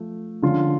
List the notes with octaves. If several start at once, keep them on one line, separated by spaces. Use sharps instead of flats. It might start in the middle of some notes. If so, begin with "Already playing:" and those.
Already playing: F3 A3
D3 F3 G#3 C#4 F4